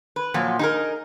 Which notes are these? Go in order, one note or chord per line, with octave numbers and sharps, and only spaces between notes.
B4
A#2 F3 F#3
D#4 G#4 A#4